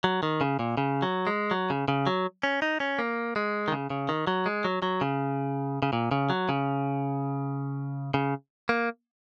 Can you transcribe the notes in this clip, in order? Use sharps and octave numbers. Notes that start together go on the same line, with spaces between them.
F#3
D#3
C#3
A#2
C#3
F#3
G#3
F#3
C#3
C#3
F#3
C#4
D#4
C#4
A#3
G#3
D#3
C#3
C#3
D#3
F#3
G#3
F#3
F#3
C#3
C#3
A#2
C#3
F#3
C#3
C#3
A#3